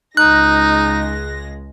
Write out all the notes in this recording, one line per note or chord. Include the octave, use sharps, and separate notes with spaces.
C#2 G#3 D#4 F#6 A#6